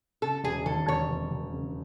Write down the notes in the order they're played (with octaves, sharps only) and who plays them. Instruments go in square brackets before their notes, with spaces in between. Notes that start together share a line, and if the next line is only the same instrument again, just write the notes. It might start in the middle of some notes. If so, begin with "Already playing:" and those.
[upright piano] C#3 [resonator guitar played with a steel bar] A4
[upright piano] E1 [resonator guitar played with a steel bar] G#4
[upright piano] D#2 [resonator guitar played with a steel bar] A4
[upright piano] E1 [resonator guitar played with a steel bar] C#5
[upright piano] E1
E1
C#3